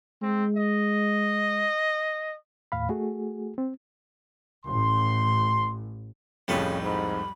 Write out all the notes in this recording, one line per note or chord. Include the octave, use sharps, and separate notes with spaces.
G#3 C4
D#5
D#2 A2 F5 B5
A3 F#4 G#4
C4
A1 C6
C2 F2 A2 C#3 G3 A4 B4
G#2 B5